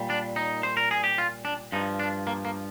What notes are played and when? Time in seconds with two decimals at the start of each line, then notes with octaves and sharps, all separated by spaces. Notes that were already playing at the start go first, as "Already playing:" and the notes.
Already playing: A#2 G3
0.10 D4
0.36 D#4
0.63 C5
0.77 A#4
0.91 G#4
1.04 G4
1.18 F4
1.45 D4
1.72 G2 F3 D#4
2.00 D4
2.27 A#3
2.45 A#3